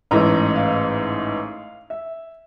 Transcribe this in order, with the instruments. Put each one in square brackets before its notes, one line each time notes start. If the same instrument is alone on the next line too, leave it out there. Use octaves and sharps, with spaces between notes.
[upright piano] A1 G#2 E3 A3 A#5
F5
E5